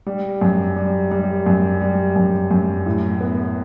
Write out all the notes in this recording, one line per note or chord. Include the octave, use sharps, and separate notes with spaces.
G3
F#2
G3
G3
F#2
G3
F#2
F#2
A2
B3